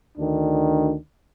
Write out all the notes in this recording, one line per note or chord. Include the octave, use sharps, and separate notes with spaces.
D2 D#3 D4